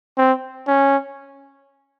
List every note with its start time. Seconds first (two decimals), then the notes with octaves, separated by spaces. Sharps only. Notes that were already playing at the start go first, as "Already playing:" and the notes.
0.18 C4
0.67 C#4